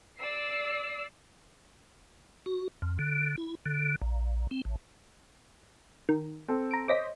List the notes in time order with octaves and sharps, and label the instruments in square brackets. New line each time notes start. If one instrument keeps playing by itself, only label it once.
[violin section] D5 E6 C7
[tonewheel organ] F#4
F2
D3
E4
D3
A#1
C4
A1
[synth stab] D#3
[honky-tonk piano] C4 A4
[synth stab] A#5 D7
[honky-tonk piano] C5 C#5 D#5 [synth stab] D6 A#6 B6